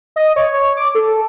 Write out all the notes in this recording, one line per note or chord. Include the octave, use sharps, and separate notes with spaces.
D#5
C#5
C#5
D6
A4